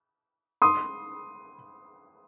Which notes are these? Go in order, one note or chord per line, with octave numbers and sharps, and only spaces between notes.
C6 D#6